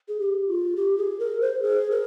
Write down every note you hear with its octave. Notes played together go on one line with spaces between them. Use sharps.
G#4
G4
F4
G4
G#4
A#4
C5
G#4
A#4